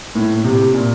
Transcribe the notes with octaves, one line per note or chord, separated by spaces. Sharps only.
A2
C3
A#2